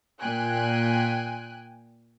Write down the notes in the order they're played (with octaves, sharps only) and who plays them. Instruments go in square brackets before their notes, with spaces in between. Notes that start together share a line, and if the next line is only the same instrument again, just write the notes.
[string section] A#2 G5 G#5 F#6